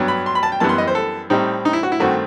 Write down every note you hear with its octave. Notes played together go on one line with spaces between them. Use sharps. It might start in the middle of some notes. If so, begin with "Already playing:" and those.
Already playing: G2 F#3 B3
B5
C6
B5
A5
G5
F#2 E3 G3 B3 A5
C6
D#5
C5
A4
A2 G3 C4 D#4
D#4
E4
F#4
E4
G2 D#3 A3 C4 F#4